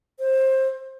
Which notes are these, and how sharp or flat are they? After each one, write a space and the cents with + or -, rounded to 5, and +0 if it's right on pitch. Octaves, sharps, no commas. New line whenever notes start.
C5 +20